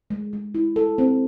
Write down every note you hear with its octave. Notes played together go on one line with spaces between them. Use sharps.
G#3
G#3
E4
A4
C4